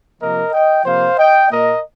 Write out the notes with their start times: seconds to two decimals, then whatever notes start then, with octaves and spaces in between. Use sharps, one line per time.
0.20 C3 F3 A#3 A#4 D#5
0.52 D#5 G5
0.85 C3 F3 A#3 C5 F5
1.18 D#5 G5
1.50 A#2 A#3 A#4 D#5